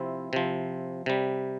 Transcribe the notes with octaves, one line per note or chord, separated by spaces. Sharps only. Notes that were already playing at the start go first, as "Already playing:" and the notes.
Already playing: C3 F3 C4 E4
C3 F3
C3 G3